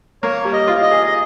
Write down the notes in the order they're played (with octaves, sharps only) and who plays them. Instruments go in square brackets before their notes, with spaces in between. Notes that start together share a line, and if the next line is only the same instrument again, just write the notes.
[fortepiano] A#3 [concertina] C#5
[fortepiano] G3
[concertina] D#5
[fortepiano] F4
[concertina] D#5
[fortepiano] G#4
[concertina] D#5